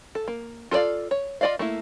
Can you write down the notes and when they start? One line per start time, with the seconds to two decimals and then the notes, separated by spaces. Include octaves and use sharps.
0.15 A4
0.28 A#3
0.71 F4 A4 C5 D5 F5
1.11 C#5
1.41 F4 F#4 D5 D#5 F5
1.59 A3 A#3 E4